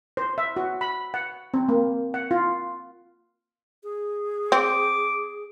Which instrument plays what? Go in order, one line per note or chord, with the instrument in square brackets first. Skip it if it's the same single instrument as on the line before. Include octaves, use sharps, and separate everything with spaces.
[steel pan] C5
E5
F#4
B5
F#5
C4
A#3
F#5
F4
[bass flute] G#4
[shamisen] C4 [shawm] D6